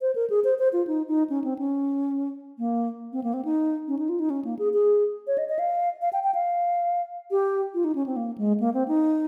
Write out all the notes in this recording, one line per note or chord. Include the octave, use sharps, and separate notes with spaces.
C5
A#4
G#4
C5
C5
F4
D#4
D#4
C#4
C4
C#4
A#3
C4
A#3
C4
D#4
C#4
D#4
F4
D#4
C#4
A#3
G#4
G#4
C#5
D#5
D#5
F5
F5
G5
G5
F5
G4
F4
D#4
C#4
C4
A#3
G#3
A#3
C4
D#4